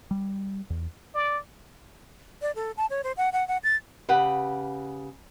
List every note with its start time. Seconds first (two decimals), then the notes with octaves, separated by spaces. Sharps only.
0.11 G3
0.70 E2
1.15 D5
2.42 D5
2.55 A4
2.77 A5
2.90 C#5
3.04 C5
3.17 F#5
3.33 F#5
3.48 F#5
3.64 A6
4.09 C#3 G4 B4 F#5